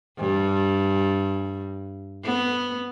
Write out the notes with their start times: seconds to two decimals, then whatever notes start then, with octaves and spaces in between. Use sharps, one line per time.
0.19 G2
2.24 B3